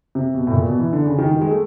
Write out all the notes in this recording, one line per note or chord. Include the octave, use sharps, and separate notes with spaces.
C3
B2
A2
A#2
B2
E3
D3
C#3
D#3
D#3
G#3
A3